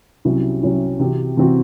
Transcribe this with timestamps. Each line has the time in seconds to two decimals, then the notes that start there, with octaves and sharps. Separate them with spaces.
0.25 C2 C3 F#3 C#4 E4
0.63 C2 C3 F#3 C#4 E4
0.99 C3 E3 C4 F#4
1.37 C3 E3 C4 F#4